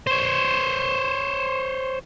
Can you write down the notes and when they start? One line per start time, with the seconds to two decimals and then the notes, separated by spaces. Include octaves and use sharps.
0.07 C5 C#5